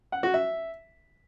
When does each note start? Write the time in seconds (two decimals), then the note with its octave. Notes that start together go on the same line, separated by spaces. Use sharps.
0.12 F#5
0.23 F#4
0.34 E5